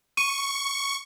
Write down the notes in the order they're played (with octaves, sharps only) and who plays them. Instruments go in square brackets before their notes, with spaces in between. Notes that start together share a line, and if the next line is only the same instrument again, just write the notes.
[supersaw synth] C#6 [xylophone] D#7